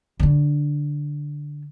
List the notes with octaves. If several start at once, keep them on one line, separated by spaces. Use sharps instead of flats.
D3 D4